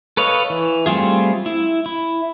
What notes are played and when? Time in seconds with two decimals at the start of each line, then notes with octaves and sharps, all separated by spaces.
0.17 A4 B4 C#5 D#5 F5
0.50 E3
0.86 G3 A3 C4 F4 G#4
1.46 E4
1.86 E4